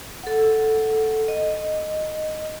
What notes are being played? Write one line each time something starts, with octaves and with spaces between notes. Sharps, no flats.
A4 F#5
D#5